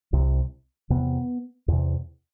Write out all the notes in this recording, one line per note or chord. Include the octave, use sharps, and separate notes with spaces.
C2 C3
E2 C3 B3
E2 C3